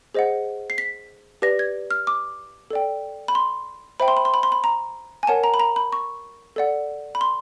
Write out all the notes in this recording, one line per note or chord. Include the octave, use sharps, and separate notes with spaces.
G#4 C5 D#5 F#5
C7
B6
G4 B4 D5 A#6
G#6
F6
D6
A4 D5 G5
B5
C6
C5 E5 G5 B5
C6
B5
C6
B5
C6
B5
A#5
G#5
A#4 C#5 F#5 A5
A#5
B5
A#5
B5
C#6
A4 D5 F#5
B5
C6